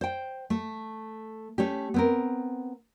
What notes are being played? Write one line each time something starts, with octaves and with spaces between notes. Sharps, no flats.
C5 G5
A3
A3 C#4 G4
B3 C4 A#4